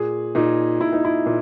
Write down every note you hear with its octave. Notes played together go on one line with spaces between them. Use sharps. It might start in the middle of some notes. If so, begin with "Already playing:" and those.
Already playing: A#2 G#4
A#2 D#4
A#2 E4
D#4
E4
A#2